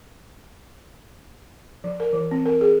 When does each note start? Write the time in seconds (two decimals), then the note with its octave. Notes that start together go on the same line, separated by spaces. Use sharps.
1.84 F3
2.00 A#4
2.13 E3
2.31 C4
2.46 A#4
2.61 G#4